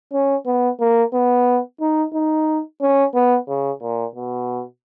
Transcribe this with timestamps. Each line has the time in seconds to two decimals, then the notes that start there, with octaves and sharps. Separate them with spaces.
0.13 C#4
0.46 B3
0.80 A#3
1.13 B3
1.81 D#4
2.14 D#4
2.81 C#4
3.14 B3
3.48 C#3
3.82 A#2
4.15 B2